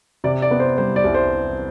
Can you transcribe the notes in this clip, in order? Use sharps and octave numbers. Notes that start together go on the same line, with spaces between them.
C3 D5
D5
B3
C5
G3 C5
D5
C2
C5